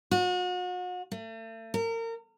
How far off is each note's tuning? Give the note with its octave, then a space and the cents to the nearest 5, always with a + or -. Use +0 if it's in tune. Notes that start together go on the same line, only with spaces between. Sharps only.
F#4 -40
A3 +40
A#4 -30